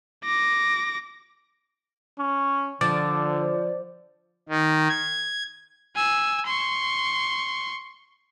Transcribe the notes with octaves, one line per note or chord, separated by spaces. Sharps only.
D6 A#6
C#4
D3 F3 D5
D#3
G#6
G#5 E6
C6 C#6